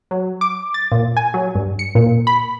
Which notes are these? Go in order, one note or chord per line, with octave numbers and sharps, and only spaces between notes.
F#3
D6
A6
A#2
G#5
F#3
G2
C#7
A#2
B5